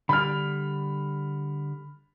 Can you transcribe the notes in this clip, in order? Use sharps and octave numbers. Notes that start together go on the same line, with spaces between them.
D3 G3 B5 F6